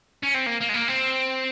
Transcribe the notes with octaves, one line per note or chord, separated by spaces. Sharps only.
C#4
C4
A#3
A#3
G#3
A#3
C4